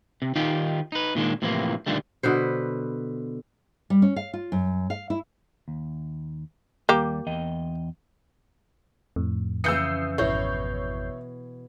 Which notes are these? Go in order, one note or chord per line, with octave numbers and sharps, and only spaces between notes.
C3
D#3 D#4 F4 G4
D#4 B4
A#2 D#3 G#3 D4
A2 C3 E3 F3 A#3
D#2 A#2 D3 G3 A3
B2 D3 B4 C5
G3
C#4
F5
F4
F#2
F5
E4
D#2
D#2 G3 A#3 G4
E2 D#5 G5
F2 A2
C#3 E3 D#6 E6 G6 C7 C#7
G#1 B2 E4 C#5 G6 C7